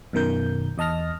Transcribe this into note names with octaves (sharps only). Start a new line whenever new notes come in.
F#2 B2 D#3 A#4 G6
E2 D#5 A5 F6 A#6